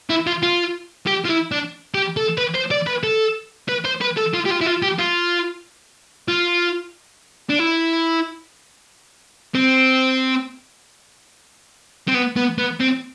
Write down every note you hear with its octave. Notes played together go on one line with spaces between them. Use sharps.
E4
F4
F4
G4
F4
E4
D4
G4
A4
B4
C5
D5
B4
A4
B4
C5
B4
A4
F4
G4
F4
E4
F4
G4
F4
F4
D4
E4
C4
C4
B3
B3
B3
C4